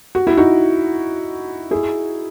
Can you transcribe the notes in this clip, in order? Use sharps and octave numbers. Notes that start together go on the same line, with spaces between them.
F#4
E4
D#4 F#4
E4 G#4